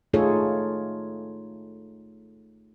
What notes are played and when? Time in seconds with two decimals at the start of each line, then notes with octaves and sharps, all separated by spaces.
0.13 A3 D#4 F4 G#4 A4 C#5